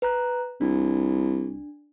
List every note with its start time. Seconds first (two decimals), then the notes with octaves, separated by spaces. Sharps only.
0.02 B4 A#5 F#6
0.61 C2 D4